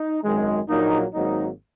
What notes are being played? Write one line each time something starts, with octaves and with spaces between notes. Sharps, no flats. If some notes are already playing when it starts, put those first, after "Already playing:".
Already playing: D#4
G#1 F#2 D#3 G#3
A#1 A#2 F#3 A#3 D#4
G#1 G#2 F#3 A#3 D#4